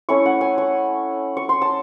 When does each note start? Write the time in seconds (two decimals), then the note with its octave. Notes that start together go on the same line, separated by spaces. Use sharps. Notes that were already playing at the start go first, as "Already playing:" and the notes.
0.09 A3 C#4 E4 C#6
0.26 F#5
0.41 G#5
0.58 C#6
1.37 C#6
1.49 C6
1.62 A5